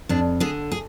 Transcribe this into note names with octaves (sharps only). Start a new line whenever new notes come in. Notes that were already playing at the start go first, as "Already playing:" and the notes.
F2 D4
D3 G#4
G#4